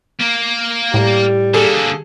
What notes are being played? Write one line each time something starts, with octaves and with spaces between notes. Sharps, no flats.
A#3
A2 G3
D3 A#3 G#4 A4